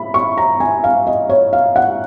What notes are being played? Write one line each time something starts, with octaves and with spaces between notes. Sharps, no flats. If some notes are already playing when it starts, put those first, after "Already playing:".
Already playing: B5
C#6
A#5
G#5
F5
D#5
C#5
F5
F#5